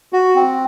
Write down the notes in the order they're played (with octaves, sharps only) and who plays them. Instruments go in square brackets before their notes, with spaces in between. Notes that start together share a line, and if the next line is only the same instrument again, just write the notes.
[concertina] F#4
C4